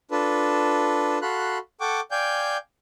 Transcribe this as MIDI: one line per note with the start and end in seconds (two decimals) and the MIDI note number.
0.11 1.18 62
0.11 1.18 65
0.11 1.18 69
0.11 1.18 71
1.22 1.58 66
1.22 1.58 69
1.22 1.58 77
1.22 1.58 83
1.22 1.58 84
1.22 1.58 90
1.81 2.01 69
1.81 2.01 78
1.81 2.01 79
1.81 2.01 85
1.81 2.01 86
2.11 2.57 74
2.11 2.57 77
2.11 2.57 79
2.11 2.57 80
2.11 2.57 91